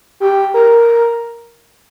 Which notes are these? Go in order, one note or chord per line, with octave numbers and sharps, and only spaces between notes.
G4
A#4